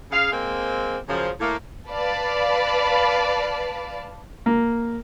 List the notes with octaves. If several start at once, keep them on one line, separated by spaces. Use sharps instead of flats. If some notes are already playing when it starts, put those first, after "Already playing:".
C#3 G#4 F5
G#3 A#3 C4
F#2 C#3 F3
A2 A3 A#3
B4 D5 F5 A5 B5
A#3